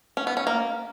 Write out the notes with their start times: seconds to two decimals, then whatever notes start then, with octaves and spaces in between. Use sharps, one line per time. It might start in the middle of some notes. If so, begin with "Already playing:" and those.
0.17 C#4
0.27 B3
0.37 C#4
0.47 A#3